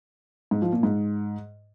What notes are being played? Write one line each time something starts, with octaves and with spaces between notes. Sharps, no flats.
G#2
F3
A#2
G#2